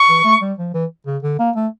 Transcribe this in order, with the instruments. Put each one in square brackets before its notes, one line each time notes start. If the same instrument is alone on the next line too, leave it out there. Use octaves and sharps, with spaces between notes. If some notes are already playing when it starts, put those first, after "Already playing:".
Already playing: [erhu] C#6
[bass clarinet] E3
A3
G3
F3
E3
C#3
D3
A#3
A3